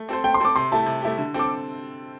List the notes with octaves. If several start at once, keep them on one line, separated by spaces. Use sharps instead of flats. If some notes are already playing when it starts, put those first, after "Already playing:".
Already playing: A3
C4 A4 C5
A3 G5
C6
C4 A4 C5 D6
C3 C6
A3 E4 G4 A5
C3
A3 E4 G4
D3
C4 A4 D6